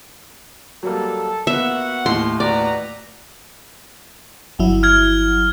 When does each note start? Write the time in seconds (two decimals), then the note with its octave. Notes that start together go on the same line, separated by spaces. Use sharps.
0.83 F#3 G3 A#3 A4
1.47 A#3 B3 F#4 E5 F#5
2.06 D#2 A2 C6
2.40 F#4 B4 D5 A#5
4.59 G1 F#3 E4
4.83 F6 G#6